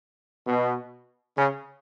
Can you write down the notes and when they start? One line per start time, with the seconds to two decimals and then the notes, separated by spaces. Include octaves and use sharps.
0.46 B2
1.36 C#3